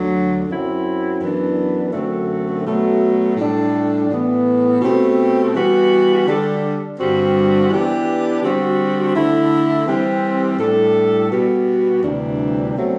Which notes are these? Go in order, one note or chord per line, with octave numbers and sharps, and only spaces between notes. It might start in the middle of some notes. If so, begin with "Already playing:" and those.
Already playing: D2 D3 F#3
F#2 F#3 C4 E4
F#2 E3 B3 D4
F#2 D3 A3 C4 F#4
B2 F#3 A3
A2 G3 D4 A4
A2 E3 B3
B2 A3 C4 G4
E3 G3 B3 F#4
D3 G3 D4 A4
G2 D3 G3 C4 F#4
E3 B3 D4 G4
D3 G3 C4 F#4
D3 A3 E4
E3 G3 C4
A2 G3 D4 A4
B2 G3 B3 F#4
D2 C3 E3 G3 D4
B2 F#3 A3 C4